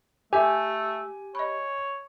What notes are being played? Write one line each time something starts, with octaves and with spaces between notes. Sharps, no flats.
A3 G4 A4 E5 G#5
C#5 D#5 B5